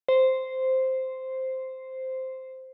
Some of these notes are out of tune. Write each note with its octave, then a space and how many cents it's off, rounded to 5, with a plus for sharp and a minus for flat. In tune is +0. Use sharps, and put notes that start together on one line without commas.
C5 -5